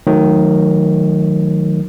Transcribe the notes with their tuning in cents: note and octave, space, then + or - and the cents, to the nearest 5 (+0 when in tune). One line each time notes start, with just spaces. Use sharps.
D#3 +0 F#3 -30 A3 -35